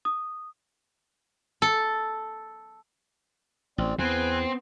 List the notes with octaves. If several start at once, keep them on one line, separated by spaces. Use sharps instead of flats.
D#6
A4
A1 C4 D5
E2 B3 C4 B4 G#5